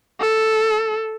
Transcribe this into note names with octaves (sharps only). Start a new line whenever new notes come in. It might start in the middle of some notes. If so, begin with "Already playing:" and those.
A4